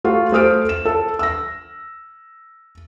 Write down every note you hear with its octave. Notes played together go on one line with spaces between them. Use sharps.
A3 F4 F#4
A3 C5 D#6 F6 D7
E7
A4
E6 A#6